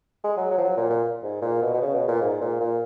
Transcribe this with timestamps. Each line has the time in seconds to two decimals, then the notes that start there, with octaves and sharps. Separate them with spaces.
0.24 G#3
0.37 F#3
0.51 F#3
0.58 F3
0.64 F#3
0.77 A#2
0.90 A#2
1.23 G#2
1.42 A#2
1.62 B2
1.74 B2
1.82 C#3
1.94 B2
2.08 A#2
2.21 G#2
2.41 A#2
2.60 A#2